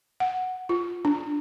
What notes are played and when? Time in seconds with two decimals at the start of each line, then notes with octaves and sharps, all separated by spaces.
0.20 F#5
0.69 F4
1.05 D4